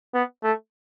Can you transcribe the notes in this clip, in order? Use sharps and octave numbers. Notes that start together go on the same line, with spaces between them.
B3
A3